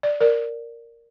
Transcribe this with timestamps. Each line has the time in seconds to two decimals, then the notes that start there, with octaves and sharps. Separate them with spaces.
0.03 D5
0.21 A#4 D5